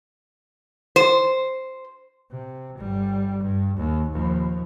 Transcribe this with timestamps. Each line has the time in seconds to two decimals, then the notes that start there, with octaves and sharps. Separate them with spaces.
0.96 C5
2.31 C3
2.78 G1 G3
3.43 G2
3.77 D#2
4.09 D#2 F3